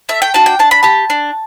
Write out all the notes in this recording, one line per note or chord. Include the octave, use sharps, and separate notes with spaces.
A3 E5
G5
D4 F#4 A5
G5
D4 A5
B5
G4 A5
D4